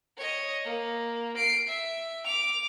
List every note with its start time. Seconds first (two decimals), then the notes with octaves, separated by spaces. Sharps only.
0.17 C#5 D#5
0.65 A#3
1.37 C7 D7
1.69 E5
2.25 D6 F7